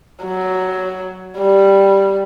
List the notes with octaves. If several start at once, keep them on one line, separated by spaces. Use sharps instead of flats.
F#3
G3